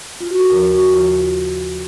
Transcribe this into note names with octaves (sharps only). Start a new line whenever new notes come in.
F4
F#4
A4
D#2 C#3 F3 A#4
F#4
D#2 C#3 F3 F4
F4